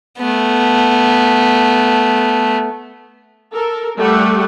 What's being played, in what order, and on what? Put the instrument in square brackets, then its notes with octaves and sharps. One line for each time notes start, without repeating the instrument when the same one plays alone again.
[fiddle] A3 B3
[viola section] A4 A#4
G3 A3 F#5